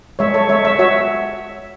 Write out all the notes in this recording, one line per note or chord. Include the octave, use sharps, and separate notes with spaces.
G#3 C#5 E5
A4 C#5
G#3 C#5 E5
C#5 E5
F#4 C#5 E5